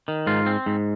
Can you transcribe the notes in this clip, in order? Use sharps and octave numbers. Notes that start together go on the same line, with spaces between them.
D#3
G#2 F4
C4
G#2